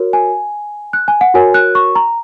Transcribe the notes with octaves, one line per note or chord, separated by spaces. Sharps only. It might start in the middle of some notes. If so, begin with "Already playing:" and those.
Already playing: F#4 A#4 C#5
G#5
F#6
G#5
F#5
F#4 A#4 C#5 G#5
F#6
C#6
A#5